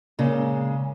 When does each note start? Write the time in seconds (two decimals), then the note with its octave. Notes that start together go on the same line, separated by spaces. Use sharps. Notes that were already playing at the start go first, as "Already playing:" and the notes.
0.19 A#2 C#3 G#3